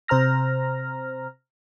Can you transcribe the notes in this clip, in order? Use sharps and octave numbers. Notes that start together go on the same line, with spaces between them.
C3 C5 A#5 F6 A#6